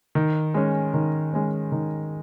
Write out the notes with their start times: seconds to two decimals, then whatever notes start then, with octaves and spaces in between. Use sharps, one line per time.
0.15 D#3
0.54 G#3 C#4
0.94 D#3
1.33 G#3 C#4
1.72 D#3